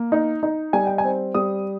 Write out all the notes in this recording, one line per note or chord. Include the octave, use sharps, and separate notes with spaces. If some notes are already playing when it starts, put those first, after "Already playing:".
Already playing: A#3
D#4
D#4
G3 G#5
G5
G#5
C4
G3 D#6